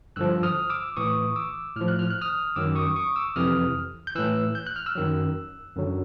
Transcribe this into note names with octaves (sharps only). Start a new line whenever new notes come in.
G2 D3 F3 E6 F#6
D#6 F6
D6 E6
A2 E3 C#6 D#6
D6 E6
A2 F3 F6
F#6
F6
F#6
D#6 F6
F#2 D#3 F#3 D6 E6
C#6 D#6
C#6 D#6
D6 E6
F2 C3 E3 D#6 F6
G6
A2 E3 E6 F#6
G6
F#6
F6
E6 F#6
F#2 D#3 F#3
F#2 D3 F#3